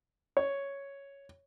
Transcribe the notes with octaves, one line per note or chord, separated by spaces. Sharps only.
C#5